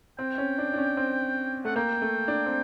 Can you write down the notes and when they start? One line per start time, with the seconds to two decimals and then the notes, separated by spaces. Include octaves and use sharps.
0.18 C4 G5
0.38 C#4
0.58 D4
0.73 D4
0.78 C#4
0.97 C4
1.65 A3 F#5
1.76 A#3 G5
2.02 A3
2.28 D4
2.46 C4